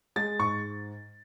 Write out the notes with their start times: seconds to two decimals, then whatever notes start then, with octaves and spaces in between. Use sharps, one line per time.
0.16 G#3 A6
0.39 G#2 C#6